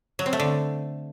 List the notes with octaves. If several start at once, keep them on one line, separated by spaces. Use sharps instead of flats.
F#3
C4
A3
D3